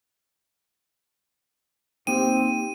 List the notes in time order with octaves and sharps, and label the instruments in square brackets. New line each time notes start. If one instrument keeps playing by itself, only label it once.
[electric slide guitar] A#3 D#4 G5 [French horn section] C4 G4 [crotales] D#7